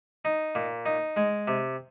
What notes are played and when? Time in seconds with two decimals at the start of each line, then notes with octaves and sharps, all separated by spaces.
0.25 D#4
0.55 A#2
0.85 D#4
1.16 G#3
1.48 C3